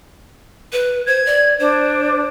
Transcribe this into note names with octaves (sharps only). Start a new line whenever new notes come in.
B4
C5 G#6
D5
D4 C5